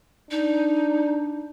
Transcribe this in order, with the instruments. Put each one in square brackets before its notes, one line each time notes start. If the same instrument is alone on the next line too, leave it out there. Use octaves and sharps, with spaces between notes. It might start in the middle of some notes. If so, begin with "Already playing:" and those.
[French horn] D4 [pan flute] D#4